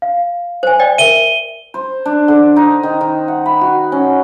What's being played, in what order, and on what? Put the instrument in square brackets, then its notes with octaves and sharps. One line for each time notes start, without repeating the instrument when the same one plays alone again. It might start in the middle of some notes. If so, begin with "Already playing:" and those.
[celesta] F5
[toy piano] C5 G#5
D5 D#5 G5
[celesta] A#4 E5 [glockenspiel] D#7 G7
[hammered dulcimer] C5
D4
D3
D#4
D#3
D#3
F#5
B5
F#4
C#4